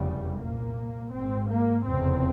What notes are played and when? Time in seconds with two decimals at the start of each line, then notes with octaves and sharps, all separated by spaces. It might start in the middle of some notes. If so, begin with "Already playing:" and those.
Already playing: F1 E2 C#3 G3
0.41 C2 A#2 A#3
1.14 G#1 G#2 C4
1.51 A#3
1.87 F1 E2 C#3 C4